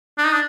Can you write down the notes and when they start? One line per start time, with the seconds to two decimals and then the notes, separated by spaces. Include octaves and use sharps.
0.18 D4
0.26 D#4
0.33 D4